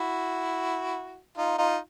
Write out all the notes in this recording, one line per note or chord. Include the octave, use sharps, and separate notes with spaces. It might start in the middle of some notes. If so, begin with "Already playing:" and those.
Already playing: E4 F#4
D#4 F4
D#4 F4